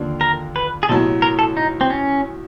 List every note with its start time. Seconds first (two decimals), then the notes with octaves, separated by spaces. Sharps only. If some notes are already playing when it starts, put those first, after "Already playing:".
Already playing: D#2 D3 F3 A#3 D4
0.21 A#4
0.56 B4
0.83 G#4
0.89 B1 A2 F#3 A4
1.22 A#4
1.39 A4
1.57 D#4
1.81 C4
1.90 C#4